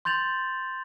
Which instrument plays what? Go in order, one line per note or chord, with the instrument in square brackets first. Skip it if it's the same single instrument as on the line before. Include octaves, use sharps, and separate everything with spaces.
[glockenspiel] C6 G6 A6 F7 F#7